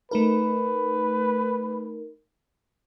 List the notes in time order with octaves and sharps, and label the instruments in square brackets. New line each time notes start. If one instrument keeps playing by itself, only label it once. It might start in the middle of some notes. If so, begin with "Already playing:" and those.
[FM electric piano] A3 D#4 A#4 [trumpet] B4